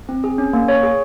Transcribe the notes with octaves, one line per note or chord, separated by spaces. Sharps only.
C4
G#4
C#4
A#3
C#5
G#4